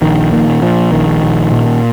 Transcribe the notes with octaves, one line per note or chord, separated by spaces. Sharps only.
A#1 D#3
A#2 D#3
A#2 F3
A#1 D#3
A#1
A#2